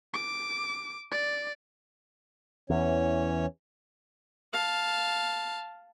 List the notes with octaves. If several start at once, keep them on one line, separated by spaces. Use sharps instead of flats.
D6
D5
E2 E3 C#4 C#5
F5 A5